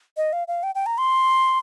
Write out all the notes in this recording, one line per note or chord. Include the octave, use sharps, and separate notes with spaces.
D#5
F5
F5
G5
G5
A#5
C6